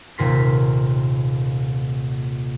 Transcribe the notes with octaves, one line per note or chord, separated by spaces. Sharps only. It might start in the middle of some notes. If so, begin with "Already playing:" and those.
D#1 C3 A#4 C6 B6